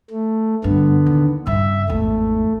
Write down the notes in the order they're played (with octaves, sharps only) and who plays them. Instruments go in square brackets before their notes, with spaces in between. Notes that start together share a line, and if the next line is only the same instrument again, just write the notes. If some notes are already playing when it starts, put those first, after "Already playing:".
[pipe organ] A3
[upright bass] G2 [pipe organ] D3 B3
[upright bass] D#2
[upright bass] G2 C#3 [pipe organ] E5
[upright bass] G#1 E2 [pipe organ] A3